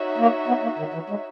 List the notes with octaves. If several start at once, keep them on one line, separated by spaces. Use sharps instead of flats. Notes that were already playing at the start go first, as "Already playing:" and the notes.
Already playing: D#4 F#4 C#5 E5
A#3
B3
A#3
D#3
E3
G#3